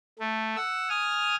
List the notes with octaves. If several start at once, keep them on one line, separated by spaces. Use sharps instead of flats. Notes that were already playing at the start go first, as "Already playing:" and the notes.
A3
F#5 E6
G#5 D#6 F6